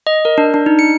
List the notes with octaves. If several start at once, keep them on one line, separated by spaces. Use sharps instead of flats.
D#5
A#4
D4
D4
D#4
C#7